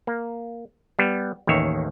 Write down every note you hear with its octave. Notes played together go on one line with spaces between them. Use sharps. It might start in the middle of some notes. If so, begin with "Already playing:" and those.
A#3
G3 B3
A1 D#2 D#3 C#5 E5